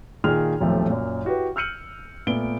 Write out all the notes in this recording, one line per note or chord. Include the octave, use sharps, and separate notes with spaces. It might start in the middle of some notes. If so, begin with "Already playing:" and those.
A#2 D#3 F4 G#4 F6 F7
D#1 B1 F2 F3 A3
F#2 A#2
E4 F#4 G4 B4
E6 F6 G6 C#7 D#7 F#7
A#2 A3 B3 D7 G7